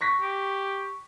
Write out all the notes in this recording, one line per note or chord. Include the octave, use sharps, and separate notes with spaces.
C#6 A#6 B6
G4